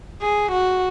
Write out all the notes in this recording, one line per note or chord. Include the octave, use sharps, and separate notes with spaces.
G#4
F#4